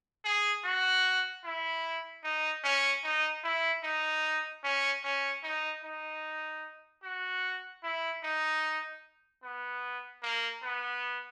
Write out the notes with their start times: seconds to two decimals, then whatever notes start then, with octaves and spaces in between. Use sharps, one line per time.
0.24 G#4
0.64 F#4
1.44 E4
2.24 D#4
2.64 C#4
3.04 D#4
3.44 E4
3.84 D#4
4.64 C#4
5.04 C#4
5.44 D#4
5.84 D#4
7.03 F#4
7.83 E4
8.24 D#4
9.43 B3
10.23 A#3
10.63 B3